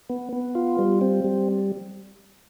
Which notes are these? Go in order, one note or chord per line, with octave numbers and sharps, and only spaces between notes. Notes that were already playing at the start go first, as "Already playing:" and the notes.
B3
B3
F4
G3
C4
G3